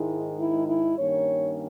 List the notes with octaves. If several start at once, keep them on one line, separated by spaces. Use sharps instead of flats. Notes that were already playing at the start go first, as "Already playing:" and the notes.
Already playing: G#2 D#3 G#3 E4
E4
E4
G2 D#3 A#3 C#4 C#5